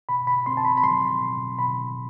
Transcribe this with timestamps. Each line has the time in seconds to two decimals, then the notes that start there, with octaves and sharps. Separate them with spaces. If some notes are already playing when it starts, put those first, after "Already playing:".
0.09 B2 B5
0.27 B5
0.46 C4 C6
0.57 A5
0.65 B5
0.77 B5
0.83 F#3 C6
1.21 B2
1.58 B2 B5